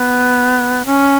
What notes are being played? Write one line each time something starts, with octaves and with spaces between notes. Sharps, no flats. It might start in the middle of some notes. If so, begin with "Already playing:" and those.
Already playing: B3
C#4